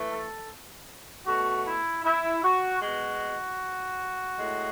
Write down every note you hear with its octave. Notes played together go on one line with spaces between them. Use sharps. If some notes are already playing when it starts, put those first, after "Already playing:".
Already playing: E3 A3
A4
B2 A3 F#4
E4
E4
F#4
B2 G#3 F#4
A2 G#3